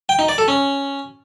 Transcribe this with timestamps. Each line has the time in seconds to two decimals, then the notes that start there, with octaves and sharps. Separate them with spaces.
0.09 G5
0.19 D#4
0.29 D5
0.38 A4
0.48 C#4